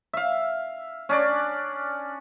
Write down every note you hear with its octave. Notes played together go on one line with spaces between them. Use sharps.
E5 F5
C#4 D4 D5